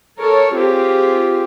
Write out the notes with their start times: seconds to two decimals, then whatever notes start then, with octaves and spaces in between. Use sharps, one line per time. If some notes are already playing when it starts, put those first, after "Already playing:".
0.18 A4 A#4 C#5
0.54 C4 F4 G4 G#4